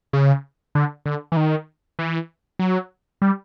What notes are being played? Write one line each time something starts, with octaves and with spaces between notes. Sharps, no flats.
C#3
D3
D3
E3
D#3
E3
F#3
G3